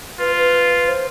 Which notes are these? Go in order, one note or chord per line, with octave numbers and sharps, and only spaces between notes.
F4 B4
B4
C5